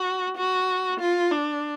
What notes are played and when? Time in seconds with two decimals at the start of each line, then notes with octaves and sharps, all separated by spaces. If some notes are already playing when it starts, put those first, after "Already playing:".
Already playing: F#4
0.37 F#4
1.00 F4
1.31 D4